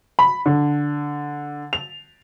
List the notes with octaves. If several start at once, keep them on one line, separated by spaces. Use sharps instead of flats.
B5
D3
F7